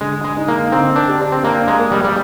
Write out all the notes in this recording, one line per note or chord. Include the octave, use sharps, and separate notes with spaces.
D3 G#3
G#3
D#4
A#3
D3 C4
D4
G4
C4
A#3 D4
G#3
A#3
G3
G3